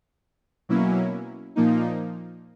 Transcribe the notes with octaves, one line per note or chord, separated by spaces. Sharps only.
B2 F#3 A#3 C#4 E4
A#2 F3 A#3 D#4